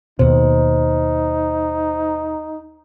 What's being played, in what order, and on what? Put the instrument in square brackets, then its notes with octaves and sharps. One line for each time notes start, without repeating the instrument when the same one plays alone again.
[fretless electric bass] D#2 B2 [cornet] D#4 [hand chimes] C5